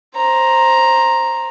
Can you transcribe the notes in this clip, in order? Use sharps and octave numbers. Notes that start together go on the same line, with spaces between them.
C5 A#5